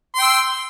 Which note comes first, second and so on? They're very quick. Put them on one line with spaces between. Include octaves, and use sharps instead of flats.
C6 G5 E6